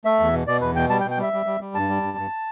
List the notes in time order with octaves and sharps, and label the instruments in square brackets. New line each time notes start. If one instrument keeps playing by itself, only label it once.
[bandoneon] A3 E5
E2
B2
B2 D5
E2 B4
B2 G5
G3 A5
G5
B2
G5
G3 E5
G3
G3
G3
G2 A5
G3
G2
G2